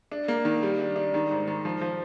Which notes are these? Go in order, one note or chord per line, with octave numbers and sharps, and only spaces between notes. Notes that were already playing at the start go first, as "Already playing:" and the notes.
D4
A#3
D#3
G3
D4
D4
D#3
G#2
D#3
F3
F3